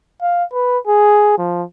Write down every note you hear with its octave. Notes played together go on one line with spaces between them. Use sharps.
F5
B4
G#4
F3